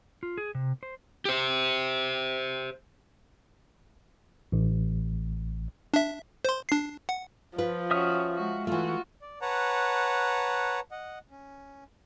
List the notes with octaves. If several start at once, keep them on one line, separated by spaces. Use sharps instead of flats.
F4
G#4
C3
C5
G4 C5
A1
D4 E5
C5 C6
D4 C7
F#5
F3 F4 B4
C#4 F#4 E5 D#6 F6
G#3 F#4
E3 A3 F4 F#4
D5
B4 C#5 F#5 A5 A#5
D#5 F#5
C#4